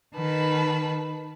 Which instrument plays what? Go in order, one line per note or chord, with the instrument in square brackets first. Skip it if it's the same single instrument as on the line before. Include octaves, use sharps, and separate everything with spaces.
[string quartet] D#3 B4 A5